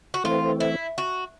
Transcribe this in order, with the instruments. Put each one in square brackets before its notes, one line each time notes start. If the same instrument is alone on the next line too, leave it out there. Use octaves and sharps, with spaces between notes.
[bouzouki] F#4
[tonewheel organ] E3 A3 C4 [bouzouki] F4
[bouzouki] E4
F#4